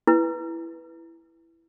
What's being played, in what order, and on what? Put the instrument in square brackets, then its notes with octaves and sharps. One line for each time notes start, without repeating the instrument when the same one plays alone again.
[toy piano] E4 B4